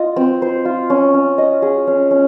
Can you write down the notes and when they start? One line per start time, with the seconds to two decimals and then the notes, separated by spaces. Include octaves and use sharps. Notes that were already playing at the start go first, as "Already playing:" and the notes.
Already playing: F4 D#5
0.16 C4
0.42 C5
0.65 F4
0.90 C#4
1.14 C#4
1.38 D#5
1.62 G#4
1.87 C#4
2.11 C#4